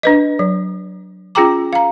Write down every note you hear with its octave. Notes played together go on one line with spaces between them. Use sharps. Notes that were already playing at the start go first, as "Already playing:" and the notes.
D4 B4 D#5
F#3
C#4 F4 G#4 G5 A#5 D6
F5 A#5